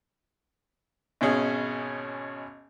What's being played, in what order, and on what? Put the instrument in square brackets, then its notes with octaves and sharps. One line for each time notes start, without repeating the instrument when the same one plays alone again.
[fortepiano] G#1 B2 C#4 G#4